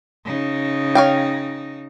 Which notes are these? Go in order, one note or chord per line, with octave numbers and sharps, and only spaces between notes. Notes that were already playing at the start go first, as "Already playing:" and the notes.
C#3 D#4
C#5 F5 G5